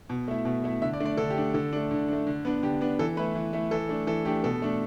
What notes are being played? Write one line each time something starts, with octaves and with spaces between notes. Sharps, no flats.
B2
A3 E4
B2
A3 E4
D3 E5
D5
A3 D4
D5
D3 A4
G4
A3 D4
D3 A4
A3 D4
D3
A3 D4
D3
B3 D4
D3 G4
B3 D4
E3 A4
A3 E4 B4
E3
A3 E4
E3 A4
A3 D4
E3 A4
A3 D4 G4
B2 A4
A3 D4